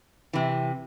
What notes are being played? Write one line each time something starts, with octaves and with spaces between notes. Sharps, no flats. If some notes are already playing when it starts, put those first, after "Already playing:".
C3 E3